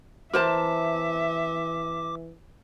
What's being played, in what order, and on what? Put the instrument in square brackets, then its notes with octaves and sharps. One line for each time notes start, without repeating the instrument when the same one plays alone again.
[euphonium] E3 [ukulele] A#4 C5 A5 [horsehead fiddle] E5 [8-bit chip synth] D6